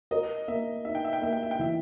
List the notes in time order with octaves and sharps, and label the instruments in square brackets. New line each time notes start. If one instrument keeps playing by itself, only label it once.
[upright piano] A#4 [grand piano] D#5
[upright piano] A#3 [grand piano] E5
[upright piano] D#4 [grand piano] E5
[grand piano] G5
E5
G5
[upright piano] A#3 [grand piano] E5
[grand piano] G5
E5
G5
[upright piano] E3 [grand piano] E5